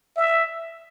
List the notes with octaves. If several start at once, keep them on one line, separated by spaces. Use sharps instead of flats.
E5